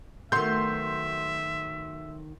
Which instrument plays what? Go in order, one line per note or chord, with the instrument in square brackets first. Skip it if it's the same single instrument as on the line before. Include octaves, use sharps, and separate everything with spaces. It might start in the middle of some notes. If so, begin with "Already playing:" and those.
[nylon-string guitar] D#3 B3 [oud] F#3 A3 [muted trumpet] E5 [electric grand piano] C6 G6